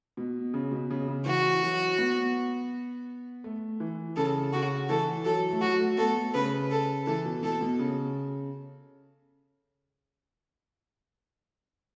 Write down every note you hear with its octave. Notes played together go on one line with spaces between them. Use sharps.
B2
C#3
B2
C#3
C#3
E3 F#4
F#3
B3
A3
E3
C#3 A4
C#3 F#4
E3 A4
F#3 A4
A3
F#3 F#4
A3
B3 A4
A3
C#3 B4
A4
E3 A4
B2
B2 A4
B2
C#3